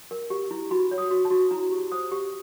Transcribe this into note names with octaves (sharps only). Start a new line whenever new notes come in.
A#4
G4
E4
F#4 B5
C#5
D#6
F#4
A5
F#4
E4 A#5
G4
C5 D#6
G4